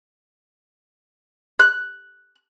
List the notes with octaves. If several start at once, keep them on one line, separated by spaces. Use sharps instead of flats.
F#6